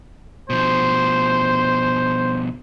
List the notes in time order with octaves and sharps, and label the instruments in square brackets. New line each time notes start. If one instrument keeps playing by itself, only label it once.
[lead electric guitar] B2 F3 [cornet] C5